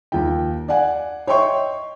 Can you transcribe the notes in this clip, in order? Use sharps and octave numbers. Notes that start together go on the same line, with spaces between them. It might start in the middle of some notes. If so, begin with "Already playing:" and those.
D#2 F3 G5
D5 F5 F#5 G#5
C#5 D#5 E5 G5 C6 C#6